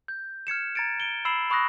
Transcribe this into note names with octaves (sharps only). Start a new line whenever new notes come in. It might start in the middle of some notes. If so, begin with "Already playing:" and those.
G6
F6 G#6 C#7 E7
A#5 G#6 A6 C#7 D7
D7 G7
B5 E6 C7 E7 F#7
B5 C#6 D#6 F#6 A#6